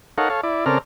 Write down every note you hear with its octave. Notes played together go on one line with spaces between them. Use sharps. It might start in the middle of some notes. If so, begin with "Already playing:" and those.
D#4 A4 A#4 C#5 F5 F#5
A4 C#5 F5
E4 D5
C#3 C4 A4 A#4 D5 F6